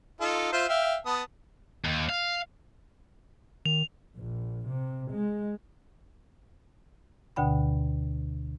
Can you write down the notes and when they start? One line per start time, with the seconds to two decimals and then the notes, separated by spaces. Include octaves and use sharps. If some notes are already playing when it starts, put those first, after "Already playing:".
0.21 D#4 F4 A4
0.53 F4 C5 E5
0.69 E5 F5 G5
1.06 B3 A5 D#6
1.85 D#2
2.09 F5
3.66 D#3 F7
4.17 A#1
4.67 C3
5.11 G#3
7.36 D2 B2 D3 G5 B5